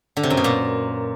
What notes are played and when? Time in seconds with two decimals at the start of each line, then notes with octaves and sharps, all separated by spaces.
0.17 D3
0.23 C3
0.30 F#2
0.37 B2
0.44 A#2